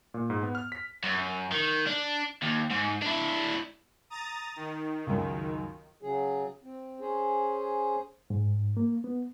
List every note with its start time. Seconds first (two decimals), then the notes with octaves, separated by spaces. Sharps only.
0.14 A#2
0.30 G#2
0.43 B3
0.55 F6
0.72 B6
1.04 F#2
1.52 D#3
1.87 D4
2.43 D#2
2.71 G#2
3.02 D4 E4
4.10 A#5 D#6 A6
4.56 D#3
5.07 C#2 F#2
6.03 C#3 F#3 G#4
6.63 C4
7.00 C#4 G#4 C5
8.30 G#2
8.77 A#3
9.04 B3